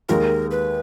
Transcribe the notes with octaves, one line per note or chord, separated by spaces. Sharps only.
D#2 D#3 G#3 A#4
B4